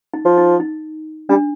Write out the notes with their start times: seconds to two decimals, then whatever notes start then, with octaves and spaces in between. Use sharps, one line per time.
0.14 D#4
0.25 F3
0.38 D#4
0.60 D#4
1.29 G3 D4